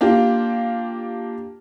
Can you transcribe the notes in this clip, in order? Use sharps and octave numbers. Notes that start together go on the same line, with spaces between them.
A#3 D4 F4 G4